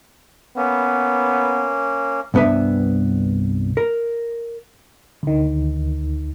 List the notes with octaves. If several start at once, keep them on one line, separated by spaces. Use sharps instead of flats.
A#3 B3 C#4
C2 G2 B3 D4 B4 E5
A#4
D2 D#3